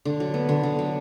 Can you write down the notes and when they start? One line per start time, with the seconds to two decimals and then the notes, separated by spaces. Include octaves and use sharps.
0.05 D3
0.20 F#3
0.34 B3
0.49 D3
0.63 D3
0.79 F#3